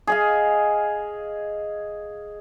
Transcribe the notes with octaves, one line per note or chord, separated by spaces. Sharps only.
G#4 D#5 F5